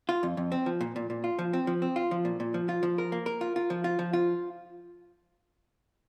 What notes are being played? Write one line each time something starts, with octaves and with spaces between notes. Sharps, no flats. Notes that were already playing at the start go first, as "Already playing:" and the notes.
F4
F2
F2
C4
F3
A#2
A#2
A#2
F4
F3
C4
F3
C4
F4
F3
A#2
A#2
F3
F4
F3
A#4
A#3
A#4
F4
F4
F3
F4
F3
F4